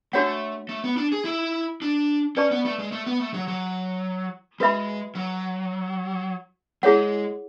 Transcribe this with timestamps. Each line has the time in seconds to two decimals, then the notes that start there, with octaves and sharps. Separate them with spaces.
0.13 A3 D4 F#4 C#5 F#5
0.69 A3
0.84 B3
0.97 D4
1.12 G#4
1.25 E4
1.82 D4
2.36 C#4 B4 D5 A5 C#6
2.51 B3
2.65 A3
2.79 G#3
2.92 A3
3.06 B3
3.20 A3
3.34 F#3
3.48 F#3
4.60 G#3 F#4 B4 E5 B5
5.15 F#3
6.83 G#3 E4 G#4 C#5 F#5